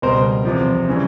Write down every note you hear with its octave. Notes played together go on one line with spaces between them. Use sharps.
C#2 B2 G3 A#4 C5
E2 C3 F3
C#3 E3 G3